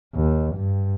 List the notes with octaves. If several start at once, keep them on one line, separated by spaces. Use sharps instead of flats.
D#2
G2